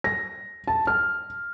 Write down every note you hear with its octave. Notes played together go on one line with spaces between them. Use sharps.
A#6
A5
F6